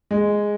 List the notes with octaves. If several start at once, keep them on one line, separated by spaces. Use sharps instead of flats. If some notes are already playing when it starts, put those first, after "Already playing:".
G#3